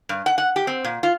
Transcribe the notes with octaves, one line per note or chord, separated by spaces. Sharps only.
G2
F#5
F#5
G4
C4
A#2
F4